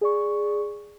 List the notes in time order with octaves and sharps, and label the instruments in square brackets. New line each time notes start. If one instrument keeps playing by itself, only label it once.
[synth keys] G#4 D5 C#6